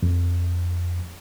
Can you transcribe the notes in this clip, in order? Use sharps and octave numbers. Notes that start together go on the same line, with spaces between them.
F2